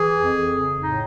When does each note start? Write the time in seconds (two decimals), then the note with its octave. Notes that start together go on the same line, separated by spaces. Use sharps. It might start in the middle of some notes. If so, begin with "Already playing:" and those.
Already playing: E3 G#4
0.16 F2
0.50 C#3
0.83 A2 D#4